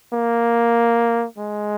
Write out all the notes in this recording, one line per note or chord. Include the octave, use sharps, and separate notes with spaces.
A#3
G#3